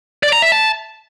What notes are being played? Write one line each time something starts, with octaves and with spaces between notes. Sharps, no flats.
D5
A#5
E5
A5